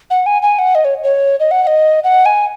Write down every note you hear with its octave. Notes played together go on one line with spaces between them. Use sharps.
F#5
G#5
G#5
F#5
D#5
C#5
C#5
D#5
F#5
F#5
D#5
F#5
G#5